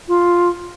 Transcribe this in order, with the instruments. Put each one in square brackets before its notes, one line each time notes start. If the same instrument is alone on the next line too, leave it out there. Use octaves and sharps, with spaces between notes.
[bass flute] F4